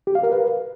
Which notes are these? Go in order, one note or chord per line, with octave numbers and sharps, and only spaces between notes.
G4
F5
A#4
B4